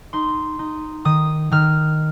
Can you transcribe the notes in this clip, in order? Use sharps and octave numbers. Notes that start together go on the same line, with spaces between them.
D#4 C6
D#4
D#3 D#6
D#3 F6